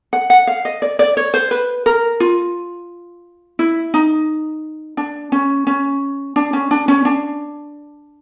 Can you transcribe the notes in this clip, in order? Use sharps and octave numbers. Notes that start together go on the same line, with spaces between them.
F#5
F#5
F5
D#5
D5
D5
C#5
C5
B4
A#4
F4
E4
D#4
D4
C#4
C#4
D4
C#4
D4
C#4
D4